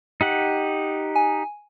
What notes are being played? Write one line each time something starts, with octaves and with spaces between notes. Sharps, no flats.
D#4 G4 F#5
G#5